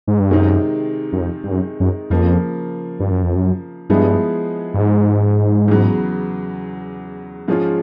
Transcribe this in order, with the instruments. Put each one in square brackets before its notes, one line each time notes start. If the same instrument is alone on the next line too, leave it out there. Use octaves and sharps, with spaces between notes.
[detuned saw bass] G#2
G2
[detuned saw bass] F#2 [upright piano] C3 D#3 G#3 C4 D#4
[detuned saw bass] F#2
F2
G2
F#2
F#2
[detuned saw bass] F2 [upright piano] C#3 F3 A#3
[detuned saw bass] G2
F#2
F2
F#2
[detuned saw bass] G2 [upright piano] F3 G#3 B3 E4 G#4
[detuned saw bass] G2
G#2
[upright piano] E2 C#3 F#3 B3
G#2 F3 G#3 C#4 F4